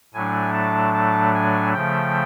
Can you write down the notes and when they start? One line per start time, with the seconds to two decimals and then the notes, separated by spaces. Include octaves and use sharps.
0.14 A2 F#3 A3 D4 G#5
0.53 A5
0.93 A5
1.34 G#5
1.74 C#3 F3 A3 G5